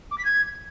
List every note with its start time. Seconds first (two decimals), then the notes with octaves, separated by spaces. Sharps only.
0.11 D6
0.18 B6
0.25 G#6